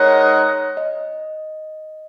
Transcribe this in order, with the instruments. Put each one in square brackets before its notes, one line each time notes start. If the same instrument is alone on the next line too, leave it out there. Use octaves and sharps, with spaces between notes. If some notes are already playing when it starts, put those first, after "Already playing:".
Already playing: [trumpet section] G#3 D#4 A#4 D#5 F#5 [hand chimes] C#5
[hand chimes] D#5